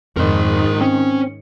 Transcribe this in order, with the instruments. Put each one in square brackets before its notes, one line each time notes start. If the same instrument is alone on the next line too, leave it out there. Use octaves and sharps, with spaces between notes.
[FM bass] F2 [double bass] G#2 D#3 [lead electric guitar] A#4 C5
[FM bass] C4 [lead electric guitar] C#4